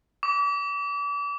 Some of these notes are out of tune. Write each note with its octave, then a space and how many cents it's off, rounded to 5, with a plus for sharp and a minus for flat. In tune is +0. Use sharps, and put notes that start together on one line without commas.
D6 -35